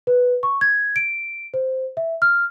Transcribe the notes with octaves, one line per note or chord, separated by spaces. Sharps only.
B4
C#6
G#6
D7
C5
E5
F6